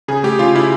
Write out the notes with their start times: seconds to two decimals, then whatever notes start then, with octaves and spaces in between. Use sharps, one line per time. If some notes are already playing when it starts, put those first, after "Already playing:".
0.08 C#3 G#4
0.23 A3 G4
0.39 C#3 F4
0.55 C#3 E4